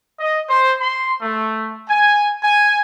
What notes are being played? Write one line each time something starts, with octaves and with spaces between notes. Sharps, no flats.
D#5
C5
C6
A3
G#5
G#5